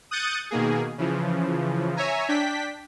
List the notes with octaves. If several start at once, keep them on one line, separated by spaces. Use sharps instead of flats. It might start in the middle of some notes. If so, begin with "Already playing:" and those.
D#6 F#6 G6 A6 C#7 D#7
B2 D#3 A#3 G#4
C#3 E3 F3
C#5 E5 G#5 A#5
D4 G5 B6